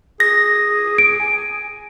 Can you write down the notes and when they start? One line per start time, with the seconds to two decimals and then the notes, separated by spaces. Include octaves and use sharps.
0.20 G#4 A#6
0.98 D7
1.20 G#5